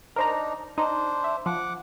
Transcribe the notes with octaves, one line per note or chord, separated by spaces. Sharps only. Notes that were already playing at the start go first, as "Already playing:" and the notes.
D4 D#4 A#4 C5 A#5
D4 D#4 C5
E5
F3 F#5 D6